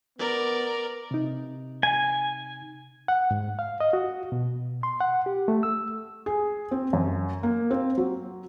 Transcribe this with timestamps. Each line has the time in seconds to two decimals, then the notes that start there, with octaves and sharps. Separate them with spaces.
0.19 B3 A#4 D5
1.11 C3 D#4
1.83 G#5
3.08 F#5
3.31 G#2
3.59 F5
3.80 D#5
3.93 F#4
4.32 B2
4.83 C6
5.00 F#5
5.26 G4
5.48 A3
5.63 E6
6.26 G#4
6.71 C4
6.93 F#2
7.43 A#3
7.71 C4
7.98 F#3